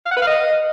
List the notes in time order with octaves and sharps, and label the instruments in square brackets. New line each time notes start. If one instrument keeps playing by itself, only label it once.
[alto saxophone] F5
F#5
B4
F5
D#5